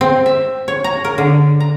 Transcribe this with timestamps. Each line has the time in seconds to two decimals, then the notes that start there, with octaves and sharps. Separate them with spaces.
0.01 C4
0.26 E5
0.68 C#5
0.84 A#5
1.05 A#4
1.18 D3
1.60 A#5